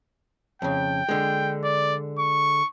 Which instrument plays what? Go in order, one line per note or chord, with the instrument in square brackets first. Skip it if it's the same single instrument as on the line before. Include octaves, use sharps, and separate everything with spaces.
[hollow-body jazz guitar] F2 C#3 [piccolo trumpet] G5
[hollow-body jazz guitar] D3 G#3
[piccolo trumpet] D5
C#6